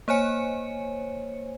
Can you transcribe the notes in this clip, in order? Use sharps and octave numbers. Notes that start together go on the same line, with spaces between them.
A#3 C5 C#5 G#5 C#7